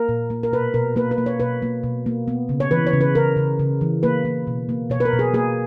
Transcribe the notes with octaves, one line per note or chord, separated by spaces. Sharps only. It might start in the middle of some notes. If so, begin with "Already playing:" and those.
Already playing: A#3 A#4
A#2
A#3
A#4
B2 B4
B2 A#4
A#3 B4
B4
A#3
C#5
B2 B4
A#3
B2
A#3
B3
C#3
C#5
E3 B4
C#5
C#3
B4
C#3 A#4
C#3
C#3
E3
A#3 B4
A#3
B2
A#3
B2 C#5
B4
A#4
B2
G#4
A#3 G#4